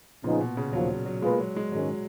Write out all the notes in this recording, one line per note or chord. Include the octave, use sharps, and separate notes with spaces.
A#2 C#3 F3 B3 D#4 G#4
B2
C#3
D#2 C#3 F3 F#3
F#3
B2 G#3 A#3 F4 G#4 B4
F#3
G#3
G#2 D#3 F#3 G#3 C#4 G#4